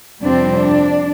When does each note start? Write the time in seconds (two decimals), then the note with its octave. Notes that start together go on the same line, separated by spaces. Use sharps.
0.22 F2 C3 G3 C4 D4
0.54 D4